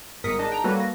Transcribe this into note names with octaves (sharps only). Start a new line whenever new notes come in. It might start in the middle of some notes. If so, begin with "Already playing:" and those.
G1 G#2 A#4 D#6 B6 C#7
D4 D#4 G#4 D#5 A5
G5 A#5
G3 A#3 F#4 A4 B4 C#5
A#6